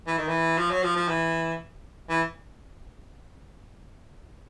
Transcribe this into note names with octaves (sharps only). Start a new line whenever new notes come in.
E3
D#3
E3
F3
F#3
F3
F3
E3
E3